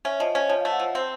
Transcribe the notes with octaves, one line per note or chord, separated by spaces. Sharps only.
C#4 E5
F3 D#5
C#4 C5
F3 C#5
F5
A3
F#5
F3 A5
C4